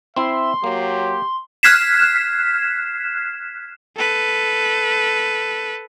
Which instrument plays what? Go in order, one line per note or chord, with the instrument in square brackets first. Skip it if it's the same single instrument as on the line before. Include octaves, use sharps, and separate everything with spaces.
[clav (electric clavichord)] C4 E4 [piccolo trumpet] E5 [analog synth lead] C6
[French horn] F#3 [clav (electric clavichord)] A#3 [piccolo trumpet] G4
[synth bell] F6 F#6 G#6 B6 C7 E7
[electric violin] A4 B4